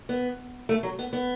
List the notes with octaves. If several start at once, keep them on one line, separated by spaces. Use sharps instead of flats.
B3
A3
F#3
B3
B3